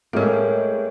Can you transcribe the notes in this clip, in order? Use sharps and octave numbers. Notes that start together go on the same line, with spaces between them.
A2 G#3 A#3 C#4 A4 A#4